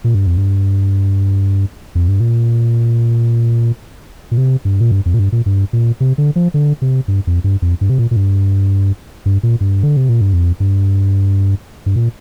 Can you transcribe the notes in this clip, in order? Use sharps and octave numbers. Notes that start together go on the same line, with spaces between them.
A#2
G2
F2
G2
F2
G2
A#2
A#2
C3
G2
A#2
G2
F2
A#2
G2
A#2
G2
A#2
C3
D3
F3
D3
C3
G2
F2
G2
F2
G2
C3
A#2
A#2
G2
G2
A#2
G2
D3
C3
A#2
G2
F2
G2
G2
A#2